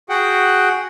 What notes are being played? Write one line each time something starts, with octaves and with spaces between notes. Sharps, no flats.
F#4 G#4 F#5 G5